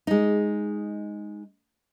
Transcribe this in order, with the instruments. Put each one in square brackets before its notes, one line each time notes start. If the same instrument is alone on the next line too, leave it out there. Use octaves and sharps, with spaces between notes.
[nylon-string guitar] G#3 D#4